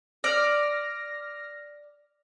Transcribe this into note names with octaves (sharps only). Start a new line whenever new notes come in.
D5 F6 A#6